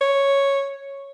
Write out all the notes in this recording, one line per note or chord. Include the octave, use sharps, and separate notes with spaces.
C#5